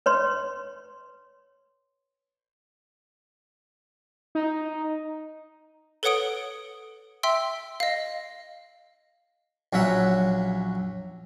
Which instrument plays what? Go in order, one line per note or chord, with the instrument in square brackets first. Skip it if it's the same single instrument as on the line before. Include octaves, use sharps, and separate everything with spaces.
[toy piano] B4 C#5 C6
[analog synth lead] D#4
[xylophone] A4 B4 C#5 F#5 D#6 D7
E5 G5 C6 E6
D#5 F5
[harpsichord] A#1 F#3 C#4 E5 F#5